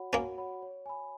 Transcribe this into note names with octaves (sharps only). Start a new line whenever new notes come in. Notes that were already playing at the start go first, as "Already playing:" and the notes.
Already playing: F#4 C#5 F#5 B5
A#3 C#4 F#4
C#5 F#5 B5
C#5
G#5 B5